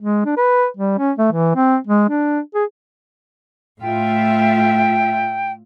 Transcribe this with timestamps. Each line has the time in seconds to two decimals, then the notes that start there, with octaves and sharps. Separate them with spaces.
0.02 G#3
0.25 D4
0.37 B4
0.77 G3
0.98 C#4
1.18 A3
1.32 E3
1.56 C4
1.87 G#3
2.09 D4
2.55 G#4
3.82 A2 F4 E5 G5